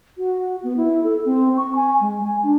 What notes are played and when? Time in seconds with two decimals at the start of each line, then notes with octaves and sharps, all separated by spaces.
0.18 F#4
0.63 B3
0.77 E4
1.04 A4
1.25 C4
1.57 C#6
1.75 G#5
2.01 G#3
2.23 G#5
2.43 D4